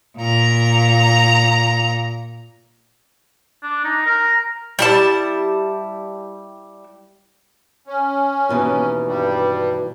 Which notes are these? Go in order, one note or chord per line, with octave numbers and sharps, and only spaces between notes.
A#2 A#5
D4
D#4
A#4
G3 E4 A5
C#4
D#2 B2 E3
G2 G3